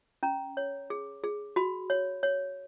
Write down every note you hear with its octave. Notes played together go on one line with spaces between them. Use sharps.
C#4 A#5
C#5
G#4
G#4
F#4 B5
C#5
C#5